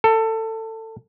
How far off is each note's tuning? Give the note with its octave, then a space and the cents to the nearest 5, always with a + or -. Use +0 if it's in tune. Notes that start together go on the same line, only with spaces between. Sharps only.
A4 +20